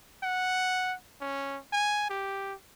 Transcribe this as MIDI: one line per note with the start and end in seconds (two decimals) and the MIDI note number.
0.23 0.95 78
1.21 1.59 61
1.73 2.09 80
2.10 2.54 67